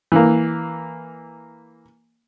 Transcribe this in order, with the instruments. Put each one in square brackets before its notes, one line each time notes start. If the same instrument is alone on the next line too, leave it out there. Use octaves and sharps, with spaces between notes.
[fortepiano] E3 A#3